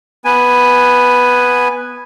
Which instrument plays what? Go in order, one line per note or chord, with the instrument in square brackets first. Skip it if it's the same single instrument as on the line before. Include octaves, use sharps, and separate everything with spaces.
[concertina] B3 G#5